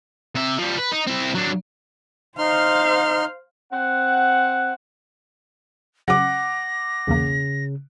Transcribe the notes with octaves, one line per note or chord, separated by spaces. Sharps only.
C3 E5
F3 G3
B4
D#4
C4 E4
F#3 D4
D#4 C5 F5 C6 F6
C4 F#5
C#3 F#3 F#5 D6 A#6
B1 E2 C#3 A#3